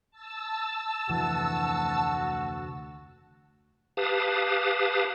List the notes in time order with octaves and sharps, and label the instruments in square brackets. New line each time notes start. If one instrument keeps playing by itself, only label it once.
[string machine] A5 E6
[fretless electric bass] F1 D2 E3 [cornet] F#4
[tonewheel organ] G4 B4 F5 A5 D#6